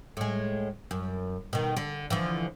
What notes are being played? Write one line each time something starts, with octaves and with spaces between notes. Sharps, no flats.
A2 G#3
F#2
B2 D#3
D3
D3 E3 F3